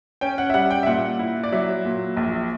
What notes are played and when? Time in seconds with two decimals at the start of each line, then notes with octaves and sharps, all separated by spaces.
0.21 C#4 G5
0.38 F#5
0.50 E5
0.54 G3 F#5
0.70 G5
0.83 E5
0.86 A#2 F#5
1.19 E4
1.44 D5
1.52 F#3 E5
1.85 A#2
2.17 A#1